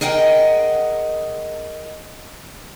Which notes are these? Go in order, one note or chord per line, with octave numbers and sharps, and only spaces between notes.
G#4 A#4 D#5 F#5 G5